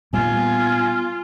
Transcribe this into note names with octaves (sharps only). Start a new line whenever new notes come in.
A#2 G3 B3 F4 G#5